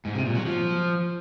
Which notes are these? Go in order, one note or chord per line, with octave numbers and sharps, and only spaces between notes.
G#2
C3
A#2
F#3
F3